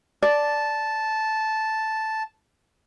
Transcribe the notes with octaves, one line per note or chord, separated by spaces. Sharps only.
D5 A5